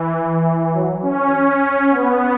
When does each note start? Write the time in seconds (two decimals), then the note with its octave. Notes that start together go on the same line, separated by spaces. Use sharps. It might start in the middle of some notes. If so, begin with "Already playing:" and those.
Already playing: E3
0.73 F#3
1.02 C#4
1.32 C#4
1.91 B3